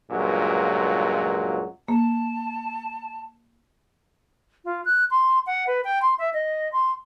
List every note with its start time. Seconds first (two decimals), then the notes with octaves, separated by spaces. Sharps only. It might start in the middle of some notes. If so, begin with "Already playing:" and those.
0.11 C#2 G2 A#2 F#3
1.88 A#3 A5
4.65 F4
4.85 F#6
5.11 C6
5.46 F#5
5.67 B4
5.84 G5
6.02 C6
6.19 E5
6.34 D#5
6.72 C6